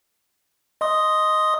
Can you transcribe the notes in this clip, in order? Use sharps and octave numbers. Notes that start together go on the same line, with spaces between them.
D#5 C6 D#6